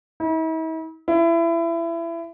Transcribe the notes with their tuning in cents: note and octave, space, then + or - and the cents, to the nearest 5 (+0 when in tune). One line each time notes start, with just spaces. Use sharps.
E4 -45
E4 +25